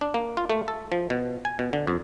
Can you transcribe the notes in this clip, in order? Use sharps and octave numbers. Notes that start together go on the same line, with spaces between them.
D4
A#3
F4
A3
A4
F3
B2
G#5
B2
D3
F2